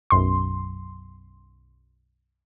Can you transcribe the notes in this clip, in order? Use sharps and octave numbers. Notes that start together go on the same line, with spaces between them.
B1 F#2 C6